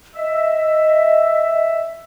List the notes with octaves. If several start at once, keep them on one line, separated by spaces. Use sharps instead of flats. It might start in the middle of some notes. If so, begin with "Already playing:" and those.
D#5 E5